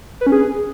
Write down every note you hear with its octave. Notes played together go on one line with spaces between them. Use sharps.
B4
C#4
G#4